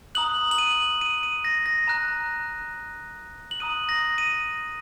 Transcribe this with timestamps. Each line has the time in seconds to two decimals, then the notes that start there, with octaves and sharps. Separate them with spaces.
0.15 A#5 D#6 F#6 F#7
0.51 F#7
0.58 D#7
1.01 D#7
1.23 D#7
1.44 A#6
1.66 A#6
1.87 A#5 F#6
3.51 F#7
3.60 A#5 D#6 F#6 D#7
3.89 A#6
4.18 D#7